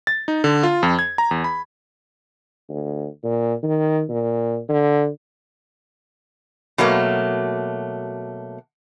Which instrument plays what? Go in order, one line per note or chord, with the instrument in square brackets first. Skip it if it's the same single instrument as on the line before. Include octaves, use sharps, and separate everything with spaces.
[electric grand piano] A6
D#4
D3
F4
F2
G#6
A#5
E2
B5
[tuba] D2
A#2
D#3
A#2
D3
[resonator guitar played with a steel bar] B2 F#3 A3 A#3